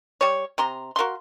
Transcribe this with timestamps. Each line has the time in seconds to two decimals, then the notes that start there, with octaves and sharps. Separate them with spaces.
0.21 G3 C#5
0.58 C3 A#5 C6
0.96 F#4 A#4 F5 C6